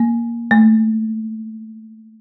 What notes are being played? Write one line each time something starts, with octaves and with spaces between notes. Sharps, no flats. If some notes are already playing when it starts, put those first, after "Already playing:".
Already playing: A#3
A3